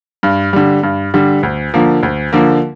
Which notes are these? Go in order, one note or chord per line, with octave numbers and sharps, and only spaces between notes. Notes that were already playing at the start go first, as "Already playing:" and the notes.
G2
D3 G3
G2
D3 G3
D2
D3 F3 A#3
D2
D3 F3 A#3